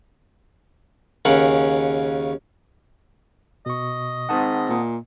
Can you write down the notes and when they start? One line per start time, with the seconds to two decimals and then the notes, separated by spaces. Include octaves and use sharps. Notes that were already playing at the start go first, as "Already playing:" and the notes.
1.25 D#2 C#3 C#4 A#4 F#5
3.66 B2 D#5 C#6
4.29 G#2 D#3 C4 F#5 A5 D#6
4.69 A#2